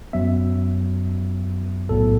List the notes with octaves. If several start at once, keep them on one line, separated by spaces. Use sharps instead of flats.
F#2 F#3 B3 E5
B1 A2 F#3 B3 A4